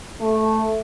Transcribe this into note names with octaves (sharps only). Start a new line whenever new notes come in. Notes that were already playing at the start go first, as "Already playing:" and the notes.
A3